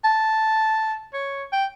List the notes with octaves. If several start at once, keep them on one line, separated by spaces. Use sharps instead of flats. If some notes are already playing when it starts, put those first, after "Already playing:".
A5
C#5
G5